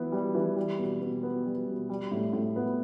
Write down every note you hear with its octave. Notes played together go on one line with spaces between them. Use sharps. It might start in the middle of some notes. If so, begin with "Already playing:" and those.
Already playing: E3 B3 E4
G3
E3
G3
B2
B2
B3
G3
B2
G3
A2
A2
B3